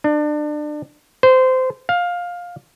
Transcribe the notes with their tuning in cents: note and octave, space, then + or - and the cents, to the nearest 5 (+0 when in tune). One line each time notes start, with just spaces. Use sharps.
D4 +30
C5 -20
F5 +15